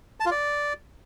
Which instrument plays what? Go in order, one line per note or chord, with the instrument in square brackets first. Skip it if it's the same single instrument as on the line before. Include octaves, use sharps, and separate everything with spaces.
[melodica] A5
F4
D5